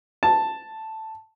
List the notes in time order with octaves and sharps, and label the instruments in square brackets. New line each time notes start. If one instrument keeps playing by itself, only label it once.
[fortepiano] A5